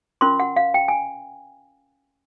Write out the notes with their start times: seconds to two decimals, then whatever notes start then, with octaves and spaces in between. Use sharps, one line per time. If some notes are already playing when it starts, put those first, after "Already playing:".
0.21 C#4 F4 A#4 C6
0.40 F#5
0.56 F5
0.74 G5
0.88 G#5